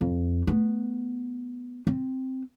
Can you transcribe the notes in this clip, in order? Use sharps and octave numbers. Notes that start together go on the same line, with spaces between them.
F2
A3 B3
C4